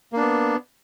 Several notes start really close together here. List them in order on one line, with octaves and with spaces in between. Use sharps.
A#3 D4 B3